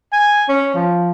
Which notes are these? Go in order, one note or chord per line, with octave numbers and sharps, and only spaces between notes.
G#5
C#4
F3